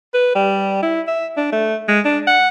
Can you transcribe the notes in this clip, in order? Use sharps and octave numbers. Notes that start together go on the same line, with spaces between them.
B4
G3
E4
E5
D4
A3
G#3
D4
F#5